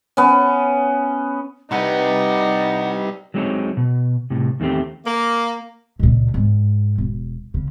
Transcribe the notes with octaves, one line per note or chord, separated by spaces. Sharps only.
B3 C#4
C3 G3 D#4 B4 F#5 B5
F#3 G#3 C4 D4 D#4 C#5
B2
A2 C3
E2 D#3 A3 C4 G4
A#3
C#2 A#2
G#2
E1
C#3